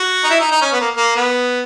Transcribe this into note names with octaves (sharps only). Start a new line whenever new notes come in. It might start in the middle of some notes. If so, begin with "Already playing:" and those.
Already playing: F#4
D#4
E4
D#4
D#4
C#4
B3
A#3
A#3
B3